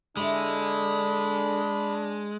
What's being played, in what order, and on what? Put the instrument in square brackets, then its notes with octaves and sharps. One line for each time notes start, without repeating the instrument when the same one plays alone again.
[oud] D3 E4 G4 [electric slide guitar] G#3 [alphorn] D4 [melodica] B5